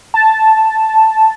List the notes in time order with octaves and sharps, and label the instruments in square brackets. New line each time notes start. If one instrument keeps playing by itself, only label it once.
[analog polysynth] A5